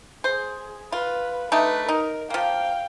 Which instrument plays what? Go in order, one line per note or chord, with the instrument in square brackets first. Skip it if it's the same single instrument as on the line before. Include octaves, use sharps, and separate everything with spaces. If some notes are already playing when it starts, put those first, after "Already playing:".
[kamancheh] G#4 [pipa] C5
[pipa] F4 [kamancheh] B4
[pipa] A3 D4 D#4 [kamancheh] B4
[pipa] D#4 [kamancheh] A#4
[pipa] F3 A#3 [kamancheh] F5 G5